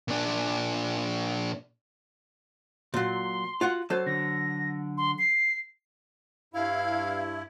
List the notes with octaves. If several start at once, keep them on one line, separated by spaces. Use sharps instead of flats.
A#2 D4
A#2 F#3 C6
F4 F#4 F#5
F#3 A4 C5
D3 A#6
C6
C7
G2 E4 F5